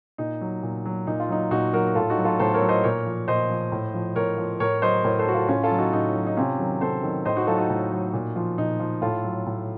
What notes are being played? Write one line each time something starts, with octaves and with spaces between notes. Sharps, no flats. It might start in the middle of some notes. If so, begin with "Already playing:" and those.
A#2 D#4
F#3
A#2
F#3
A#2 D#4
F4
F#3 D#4
A#2 D#4 F#4
F#3 F#4 A#4
A2 F4 A4
D#4 F#4
F#3
F4 A4
A2 A4 C5
A#4 C#5
F#3
C5 D#5
A#2 A#4 C#5
F3
A#2 C5 D#5
F3
A2
F3
A2 A#4 C#5
F3
A2 A#4 C#5
F#3 C5 D#5
A2 A#4 C#5
A4 C5
F#3 F#4
F4 A4
A2 C#4 F4
F4 A4
F#3
D#4 F#4
A2 D#4
F#3
D#4
C3 C#4 F4
D#3 F#3
C3 A4 C5
D#3 F#3
A2 C5 D#5
D#4 F#4
F#3 F4 A4
D#4 F#4
A2
F#3
A#2
F3
A#2 D#4
F3
A2 F4 A4
F#3
A2